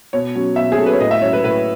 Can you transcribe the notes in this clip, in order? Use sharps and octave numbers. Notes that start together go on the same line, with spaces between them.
B2 C#5
F#3 C#4
B2 E5
G#4
F#3 C#4 A4 B4
C#5
A2 D#5
E5
F#3 A3 C#4 C#5
B4
A2 B4